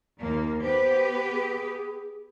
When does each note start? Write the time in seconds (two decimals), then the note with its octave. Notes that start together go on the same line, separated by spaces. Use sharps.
0.20 D#2 A#3
0.62 B3 G4 B4 C5
1.32 G#4